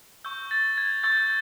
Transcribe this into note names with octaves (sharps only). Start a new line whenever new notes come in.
C#6 E6 G6
A6
G#6
C#6 E6 G6 A6